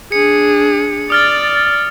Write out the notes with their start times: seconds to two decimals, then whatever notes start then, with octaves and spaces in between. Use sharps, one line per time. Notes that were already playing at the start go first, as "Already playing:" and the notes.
0.12 D4 G#4 C#7
1.10 D5 D#6 F6 A6